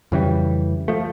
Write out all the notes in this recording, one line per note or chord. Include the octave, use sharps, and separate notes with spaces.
F2 C#3 E3 G3
F3 A3